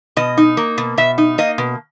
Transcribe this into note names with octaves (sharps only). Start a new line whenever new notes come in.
B2 D#5
D#4
A#3
B2
B2 E5
D#4
A#3 D#5
B2